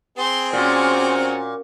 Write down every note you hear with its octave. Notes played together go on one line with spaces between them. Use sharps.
C4 G#4 C5 C6
A#2 C#4 F#4